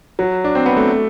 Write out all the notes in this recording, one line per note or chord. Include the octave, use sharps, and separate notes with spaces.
F#3
D4
C4
B3
A3